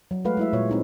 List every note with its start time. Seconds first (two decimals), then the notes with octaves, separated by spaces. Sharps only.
0.11 F#3
0.25 G#3 A3 F#4 B4 F5
0.37 G#3 E4 E5
0.53 A#2 G#3 F4 C#5
0.69 C4 D#4 E4